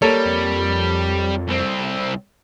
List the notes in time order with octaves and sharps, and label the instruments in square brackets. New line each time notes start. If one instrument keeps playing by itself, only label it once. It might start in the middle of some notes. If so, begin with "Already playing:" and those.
[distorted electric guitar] G3 [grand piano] A#3 A4 C#5
[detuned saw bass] F2
[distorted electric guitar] C2 C4